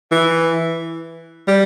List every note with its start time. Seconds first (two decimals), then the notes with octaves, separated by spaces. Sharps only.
0.12 E3
1.47 G3